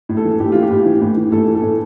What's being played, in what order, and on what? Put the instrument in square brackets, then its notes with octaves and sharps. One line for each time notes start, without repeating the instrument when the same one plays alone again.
[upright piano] A2
A4
E3
A2 G4
E3 F4
G4
A2
E3
A2
E3
A2 A4
E3
A4
A2